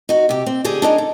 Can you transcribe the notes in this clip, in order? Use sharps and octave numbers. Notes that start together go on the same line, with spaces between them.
D#4 F#4
C3 G4
C4
D3 G4 G#4 G#5
D4 D#4 G#4 A#4
A4